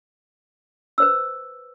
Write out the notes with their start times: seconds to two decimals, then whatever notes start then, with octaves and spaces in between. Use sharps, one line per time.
0.98 B4 C5 E6